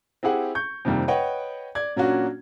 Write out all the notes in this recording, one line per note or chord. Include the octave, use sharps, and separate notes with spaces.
C4 E4 G4 G#4 F#5
C#6 G6
F2 C3 D#3 G3 A#3
B4 C#5 D#5 F#5 G5
D5 G#6
A#2 F#3 A#3 C#4 D4 F#4